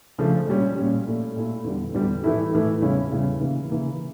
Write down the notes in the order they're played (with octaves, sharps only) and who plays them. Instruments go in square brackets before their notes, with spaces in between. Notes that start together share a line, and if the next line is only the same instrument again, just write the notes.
[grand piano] C#3 F3 A3 D4
A#2 G3 C#4
A#2 G3 C#4
A#2 A3 E4
A#2 A3 E4
E2 D3 G3
E2 D3 G3
A2 E3 A3 E4
A2 E3 A3 E4
E2 C#3 G3 C#4 E4
E2 C#3 G3 C#4 E4
C#3 E3 A#3
C#3 E3 A#3